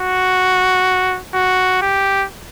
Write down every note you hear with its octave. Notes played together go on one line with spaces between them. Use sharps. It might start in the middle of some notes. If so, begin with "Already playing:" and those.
Already playing: F#4
F#4
G4